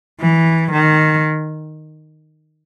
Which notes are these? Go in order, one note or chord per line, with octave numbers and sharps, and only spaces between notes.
E3
D#3